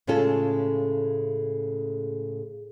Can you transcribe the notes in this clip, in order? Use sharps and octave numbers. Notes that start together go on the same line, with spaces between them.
A2 C#3 G#3 C#4 F4 A4